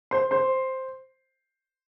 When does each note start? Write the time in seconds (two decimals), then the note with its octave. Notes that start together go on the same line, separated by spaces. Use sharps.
0.11 C5 C6
0.31 C5 C6